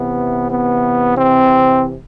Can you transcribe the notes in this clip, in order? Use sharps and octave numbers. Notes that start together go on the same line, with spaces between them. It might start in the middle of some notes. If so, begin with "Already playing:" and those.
Already playing: C3 E3 B3
B3
C4